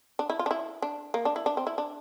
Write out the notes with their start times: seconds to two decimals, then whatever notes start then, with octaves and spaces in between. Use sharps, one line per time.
0.19 D4
0.30 E4
0.39 F4
0.46 D4
0.51 E4
0.82 D4
1.14 A#3
1.25 D4
1.36 E4
1.46 D4
1.57 C4
1.67 E4
1.78 D4